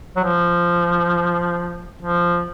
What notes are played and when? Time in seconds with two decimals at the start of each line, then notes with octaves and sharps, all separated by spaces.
0.16 F#3
0.24 F3
2.01 F3